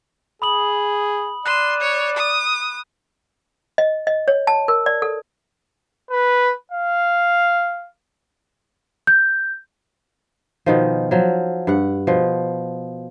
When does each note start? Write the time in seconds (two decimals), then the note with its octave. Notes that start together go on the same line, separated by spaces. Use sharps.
0.42 G#4 B5 D#6 F#7
1.46 D5 C6 F#6 D#7 E7
1.81 C#5
2.17 D#6
3.78 D#5
4.07 D#5
4.28 C#5
4.47 A5
4.68 A#4
4.86 D5
5.02 A4
6.11 B4
6.72 F5
9.07 G6
10.66 B2 D#3 F3
11.11 F3 F#3
11.67 G2 F#5
12.07 B2 F3